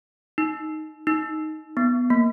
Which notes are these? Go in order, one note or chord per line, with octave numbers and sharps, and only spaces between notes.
D#4
D#4
B3
A#3